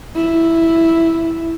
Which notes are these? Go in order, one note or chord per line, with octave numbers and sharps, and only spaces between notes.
E4